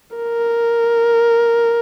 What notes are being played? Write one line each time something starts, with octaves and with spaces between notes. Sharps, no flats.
A#4